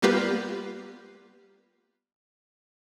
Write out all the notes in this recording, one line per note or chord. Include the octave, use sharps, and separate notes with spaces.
G3 A#3 B3 F4 G4 B4